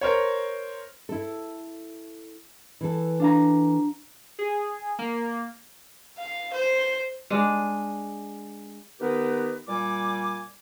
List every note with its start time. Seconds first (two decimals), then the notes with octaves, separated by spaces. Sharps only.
0.01 A#4 C5 C#5
1.09 E4 A4
2.81 E3 A4
3.20 D4 F5 A#5
4.39 G#4
4.99 A#3
6.18 F5
6.53 C5
7.30 G#3 D4
9.00 D#3 B3 G4 A#4 B4
9.68 A#2 G3 D5 G#5 D6